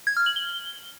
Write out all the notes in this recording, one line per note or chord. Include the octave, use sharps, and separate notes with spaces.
G#6
F6
F#7
G7